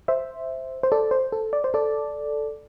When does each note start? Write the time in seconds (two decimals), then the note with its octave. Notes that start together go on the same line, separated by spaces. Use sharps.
0.08 C5 E5
0.83 C5
0.92 A4 D5
1.11 C5
1.32 A4
1.53 D5
1.64 C5
1.74 A4 D5